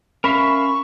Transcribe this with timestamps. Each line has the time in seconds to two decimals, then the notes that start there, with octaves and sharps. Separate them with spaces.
0.24 C#4 A#4 E5 F5 B5 C#6